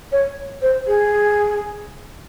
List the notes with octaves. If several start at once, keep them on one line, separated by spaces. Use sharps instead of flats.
C#5
C5
G#4